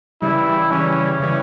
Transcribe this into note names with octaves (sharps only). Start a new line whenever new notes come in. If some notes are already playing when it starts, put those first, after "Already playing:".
C#3 E3 G3 E4
C#3 E3 G3 C#4
C#3 E3 G3